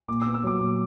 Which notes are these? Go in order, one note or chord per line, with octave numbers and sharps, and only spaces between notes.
A#2 D6
E6
B3
E6
F#3 D6
A#2